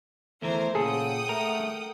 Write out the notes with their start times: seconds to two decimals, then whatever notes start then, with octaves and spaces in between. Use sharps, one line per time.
0.42 E2 E3 A3 A#4 C5
0.75 A#2 C#3 G#4 A4 F#5 G5 D#6
1.29 A3 A#4